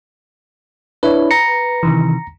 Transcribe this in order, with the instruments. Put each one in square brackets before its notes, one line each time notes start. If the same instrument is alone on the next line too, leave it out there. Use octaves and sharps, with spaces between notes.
[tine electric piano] D4 E4 C#5 [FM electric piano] B4
[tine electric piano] A#5 A#6 C#7
[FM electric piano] C3 D#3 E3